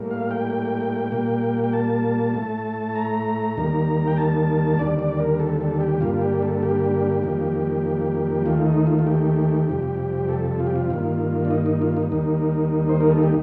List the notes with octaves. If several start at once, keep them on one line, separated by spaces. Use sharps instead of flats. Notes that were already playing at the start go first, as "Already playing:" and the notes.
Already playing: A2 G3 A#3
F5
G5
A#2 G3 A#3
G5
A5
A2 A3
A#5
D#2 D#3 G3 A#3
G5
A5
D#2 D3 G3 D5
D5
A#4
A4
A4
G4
G2 D3 G3 A#3 F4
G4
A4
G4
F2 D#3 G3 A#3
D#2 D#3 A3 F4
D#4
F4
F4
G4
F2 C3 G3
A4
F4
G4
F4
G2 D#3 A#3
D4
D#4
D#4
F4
D#4
D#2 D#3 G3 A#3
C5
A#4
A4
G4